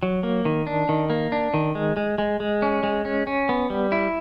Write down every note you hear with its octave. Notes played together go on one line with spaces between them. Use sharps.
F#3
A#3
D#3
D4
D#3
A#3
D4
D#3
G#3
G#3
G#3
G#3
C#4
G#3
C#4
C#4
B3
G3
E4